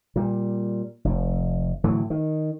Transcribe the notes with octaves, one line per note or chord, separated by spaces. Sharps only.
A#2 G3
F1
A2 D3 E3 F#3
D#3